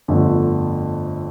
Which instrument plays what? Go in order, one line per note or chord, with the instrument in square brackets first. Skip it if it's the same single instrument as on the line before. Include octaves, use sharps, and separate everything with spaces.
[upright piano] G1 F2 D3 A3